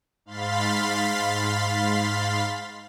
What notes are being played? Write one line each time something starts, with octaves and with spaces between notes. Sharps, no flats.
G#2 F5 B5 C6 A6 B6